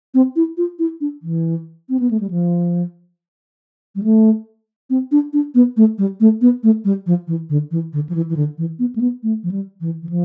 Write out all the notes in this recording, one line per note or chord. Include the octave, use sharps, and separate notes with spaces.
C4
E4
F4
E4
D4
E3
C4
B3
A3
G3
F3
G3
A3
C4
D4
D4
B3
A3
G3
A3
B3
A3
G3
F3
E3
D3
E3
D3
F3
E3
E3
D3
E3
B3
A3
B3
A3
F3
G3
E3
E3
F3